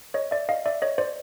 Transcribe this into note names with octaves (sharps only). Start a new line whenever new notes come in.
C#5 D#5
D5 E5
D#5 F5
D5 E5
C#5 D#5
C5 D5